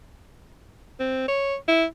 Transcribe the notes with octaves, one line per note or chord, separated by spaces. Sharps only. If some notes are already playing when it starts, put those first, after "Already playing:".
C4
C#5
E4